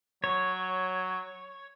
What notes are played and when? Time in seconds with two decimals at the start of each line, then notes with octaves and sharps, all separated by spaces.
0.24 F#3 C#5